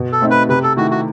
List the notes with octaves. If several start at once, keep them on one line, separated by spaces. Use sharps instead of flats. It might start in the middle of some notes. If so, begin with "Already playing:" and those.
Already playing: B2
A4
A3 C4 D#4
B4
C3 B4
A4
D#3 A3 E4 F#4
F#4